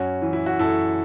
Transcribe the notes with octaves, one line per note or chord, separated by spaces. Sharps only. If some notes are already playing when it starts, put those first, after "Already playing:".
Already playing: F#2 C#4 F#4
E3
E4
F#4
F#2 E4 A4